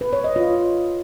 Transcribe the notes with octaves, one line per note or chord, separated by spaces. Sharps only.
B4
C#5
D#5
F4